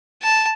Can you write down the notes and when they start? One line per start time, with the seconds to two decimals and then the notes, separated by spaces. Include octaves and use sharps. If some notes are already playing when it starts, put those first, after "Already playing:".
0.22 A5